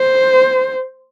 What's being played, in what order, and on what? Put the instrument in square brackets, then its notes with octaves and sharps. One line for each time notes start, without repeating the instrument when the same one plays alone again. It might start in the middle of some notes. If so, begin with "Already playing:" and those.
Already playing: [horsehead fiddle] C5